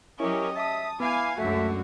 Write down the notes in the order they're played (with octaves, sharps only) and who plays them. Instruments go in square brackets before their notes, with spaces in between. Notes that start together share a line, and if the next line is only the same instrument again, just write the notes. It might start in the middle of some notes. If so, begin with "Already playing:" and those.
[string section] F#3 C#4 G4 [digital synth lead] E4 [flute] A#4 [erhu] D#5
[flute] E5 [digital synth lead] A5 [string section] D#6
[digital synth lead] B3 [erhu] E4 [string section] F5 G#5 [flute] D6
[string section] C#2 F#2 D3 [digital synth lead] A3 [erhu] F#4 [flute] E5